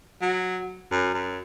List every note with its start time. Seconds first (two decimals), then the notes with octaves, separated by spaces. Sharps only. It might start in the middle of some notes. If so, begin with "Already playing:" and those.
0.21 F#3
0.92 F#2
1.14 F#2